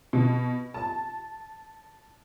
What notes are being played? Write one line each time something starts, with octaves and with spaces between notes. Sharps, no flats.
B2
A5